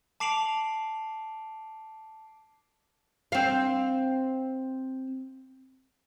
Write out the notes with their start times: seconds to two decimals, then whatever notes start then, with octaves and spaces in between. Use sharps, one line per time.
0.20 A5 D6 C7 D7 F7 F#7
3.32 C4 F5